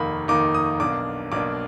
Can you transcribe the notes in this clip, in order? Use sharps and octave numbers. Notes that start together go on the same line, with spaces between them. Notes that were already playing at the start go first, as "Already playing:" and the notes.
Already playing: F1 D#2 D#3 A#3 D#4 B5
F1 D#2 D#3 A#3 D#4 D6
D#6
B1 B2 A#3 D4 D6
B1 B2 A#3 D4 D6